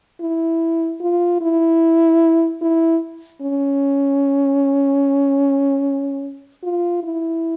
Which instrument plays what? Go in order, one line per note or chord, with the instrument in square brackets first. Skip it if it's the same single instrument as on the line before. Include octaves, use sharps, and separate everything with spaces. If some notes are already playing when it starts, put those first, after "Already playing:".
[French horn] E4
F4
E4
E4
C#4
F4
E4